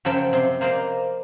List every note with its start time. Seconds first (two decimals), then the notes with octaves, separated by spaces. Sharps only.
0.05 F#2 C#3 F3 F#3 G5 A5
0.33 C3 C6
0.61 A#3 C5 D5 D#5 F5